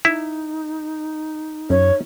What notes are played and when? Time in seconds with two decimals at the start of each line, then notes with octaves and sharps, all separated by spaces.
0.05 D#4 E4
1.70 F#2 C#5